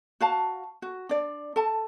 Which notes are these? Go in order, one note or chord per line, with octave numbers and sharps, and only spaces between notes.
F#4 F5 A5
F#4
D4 D5
A4 A5